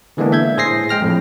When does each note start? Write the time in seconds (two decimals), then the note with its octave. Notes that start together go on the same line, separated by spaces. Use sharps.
0.17 D3 E3 G#3 A#3 B3 D4
0.32 E5 G6 G#6
0.57 A2 G#4 C5 A#6 C7
0.89 G#3 G5 F6 A#6
1.02 F2 A2